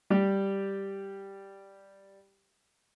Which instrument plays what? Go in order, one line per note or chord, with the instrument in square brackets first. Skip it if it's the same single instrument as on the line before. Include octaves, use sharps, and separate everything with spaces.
[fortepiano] G3 G4